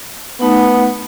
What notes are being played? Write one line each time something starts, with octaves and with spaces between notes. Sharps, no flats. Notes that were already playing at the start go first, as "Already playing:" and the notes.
A3 B3 D#4 F#5